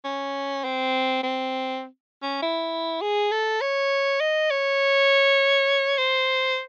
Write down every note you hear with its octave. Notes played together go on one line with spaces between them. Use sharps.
C#4
C4
C4
C#4
E4
G#4
A4
C#5
D#5
C#5
C5